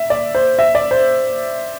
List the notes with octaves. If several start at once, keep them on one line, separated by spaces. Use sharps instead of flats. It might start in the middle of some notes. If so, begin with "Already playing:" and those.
Already playing: E5
D5
C5
E5
D5
C5